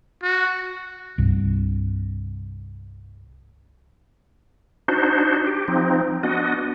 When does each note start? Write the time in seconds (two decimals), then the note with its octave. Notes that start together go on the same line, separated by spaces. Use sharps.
0.23 F#4
1.18 C2 G2
4.88 D4 D#4 F#4 C5
5.47 G4
5.68 F3 C4 D#4
6.23 B3 D4 F#4 D#5